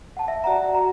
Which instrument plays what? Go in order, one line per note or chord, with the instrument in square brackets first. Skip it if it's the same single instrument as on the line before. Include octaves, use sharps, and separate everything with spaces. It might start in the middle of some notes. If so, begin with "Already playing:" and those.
[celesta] F#5 A5
E5
[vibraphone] F#4 D5 F#5 [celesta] A#5
[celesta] A#5